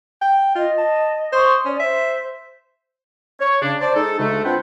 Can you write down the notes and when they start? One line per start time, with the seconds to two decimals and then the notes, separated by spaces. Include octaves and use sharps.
0.21 G5
0.55 F4 D#5
0.78 A5
1.33 C5 C6 C#6 D#6
1.65 C#4 D5
1.80 C5 E5
3.40 C#5
3.61 C#3 D4
3.80 C5 D5 A5
3.95 G#3 D#4 G#4 A4
4.19 D2 C#3 G#3 A3
4.45 C4 D4 F4 B4 F#5 G5